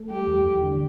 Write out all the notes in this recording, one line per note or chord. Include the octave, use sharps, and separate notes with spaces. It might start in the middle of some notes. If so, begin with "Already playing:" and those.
Already playing: A3
G3 G4
E2
E2
D3